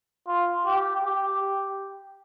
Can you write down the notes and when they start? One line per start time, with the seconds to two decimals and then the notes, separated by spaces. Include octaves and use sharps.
0.28 F4
0.66 G4
1.04 G4